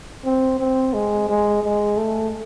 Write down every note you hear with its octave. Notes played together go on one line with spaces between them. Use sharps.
C4
C4
G#3
G#3
G#3
A3